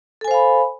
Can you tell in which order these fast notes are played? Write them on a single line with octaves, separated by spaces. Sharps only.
A4 G#5 C5 F5 B5